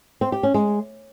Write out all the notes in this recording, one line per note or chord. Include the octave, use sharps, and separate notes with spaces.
C4
G4
C#4
G#3